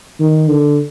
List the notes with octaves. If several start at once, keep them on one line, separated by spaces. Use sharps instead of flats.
D#3
D3